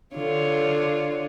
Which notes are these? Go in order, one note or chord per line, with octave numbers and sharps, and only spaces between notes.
D3 F4 C#5